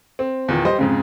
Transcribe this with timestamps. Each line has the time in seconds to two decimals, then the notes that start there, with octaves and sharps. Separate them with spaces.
0.19 C4
0.48 E2 A#2 D#3
0.65 G3 C5 D#5
0.79 F2 G#2 C#3